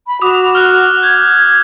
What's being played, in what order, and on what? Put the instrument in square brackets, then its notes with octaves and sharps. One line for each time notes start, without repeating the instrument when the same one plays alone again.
[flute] B5
[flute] F#4 [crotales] D6 D#6 F7
[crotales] F6 F#6
[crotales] G6 [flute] G#6